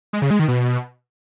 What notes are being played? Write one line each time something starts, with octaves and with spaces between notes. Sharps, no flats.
G#3
C#3
G#3
D#3
B2